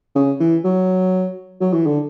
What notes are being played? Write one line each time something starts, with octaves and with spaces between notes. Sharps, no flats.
C#3
E3
F#3
F#3
E3
D3